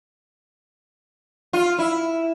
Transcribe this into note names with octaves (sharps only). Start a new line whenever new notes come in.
F4
E4